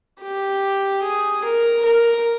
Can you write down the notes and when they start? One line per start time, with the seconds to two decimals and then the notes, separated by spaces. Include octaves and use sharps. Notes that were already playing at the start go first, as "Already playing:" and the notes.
0.21 G4
1.03 G#4
1.44 A#4
1.85 A#4